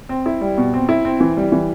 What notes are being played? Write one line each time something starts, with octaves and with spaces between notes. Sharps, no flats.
C4
E4
G3
B2
C4
E4
C4
E3
G3
E3